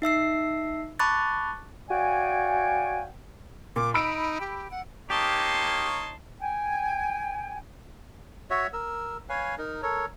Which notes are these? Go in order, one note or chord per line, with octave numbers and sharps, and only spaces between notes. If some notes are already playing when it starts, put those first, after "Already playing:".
D#4 E5 E6 C7
A5 B5 C#6 D6 F#6 A6
F#4 C#5 D5 F5 G5 G#5
A#2 D6
D#4 B5 E6 D7
G4
F#5
A#3 D#4 G4 C#5 A5 C6
G5 G#5
F#4 C#5 E5
A#4 E6
B4 C#5 F5 G#5
D#4 A#4
A4 A#4 C#5